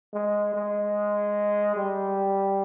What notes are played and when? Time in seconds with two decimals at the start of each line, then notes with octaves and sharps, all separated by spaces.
0.13 G#3
0.54 G#3
1.76 G3